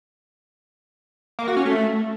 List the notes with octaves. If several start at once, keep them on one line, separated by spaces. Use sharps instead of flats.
A#3
F#4
C#4
A3